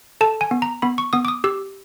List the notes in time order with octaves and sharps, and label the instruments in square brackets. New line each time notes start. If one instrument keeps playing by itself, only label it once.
[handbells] A4 A5
G#5
B3
A#5
B3 B5
C#6
B3 D#6
D6
D#6
G4 E6